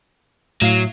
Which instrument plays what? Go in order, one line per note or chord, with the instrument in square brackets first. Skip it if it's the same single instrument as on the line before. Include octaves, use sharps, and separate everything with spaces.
[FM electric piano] A2 F5 C7 [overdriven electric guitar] F#3